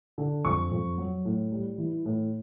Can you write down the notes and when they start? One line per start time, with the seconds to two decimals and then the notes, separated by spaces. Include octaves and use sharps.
0.18 D3
0.45 F2 C#6
0.71 F2
0.98 F#3
1.25 A2
1.52 G3
1.78 E3
2.05 A2